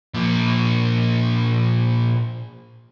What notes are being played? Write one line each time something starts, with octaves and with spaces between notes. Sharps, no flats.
A#2 F3